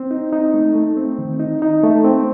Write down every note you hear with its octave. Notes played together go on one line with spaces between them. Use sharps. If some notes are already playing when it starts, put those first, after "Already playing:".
Already playing: C4
D#4
D#4
A3
A3
C4
D#3
D#4
D#4
A3
C4